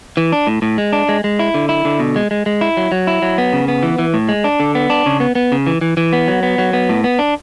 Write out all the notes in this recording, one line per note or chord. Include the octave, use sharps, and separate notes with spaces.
E3
D4
A2
A2
G#3
D4
G#3
G#3
E4
D3
E4
D3
B2
G#3
G#3
G#3
E4
F#3
F#3
E4
F#3
B3
C#3
B3
E3
E3
A2
G#3
D4
D3
B3
D4
C#3
B3
B3
C#3
E3
E3
E3
B3
F#3
B3
F#3
B3
A2
B3
D4